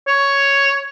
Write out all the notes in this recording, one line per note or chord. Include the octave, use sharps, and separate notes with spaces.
C#5